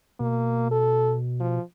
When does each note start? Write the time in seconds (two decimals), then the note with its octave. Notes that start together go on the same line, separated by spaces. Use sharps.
0.20 B2 A#3
0.71 A4
1.40 F3